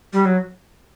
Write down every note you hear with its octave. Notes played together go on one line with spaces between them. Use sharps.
G3
F#3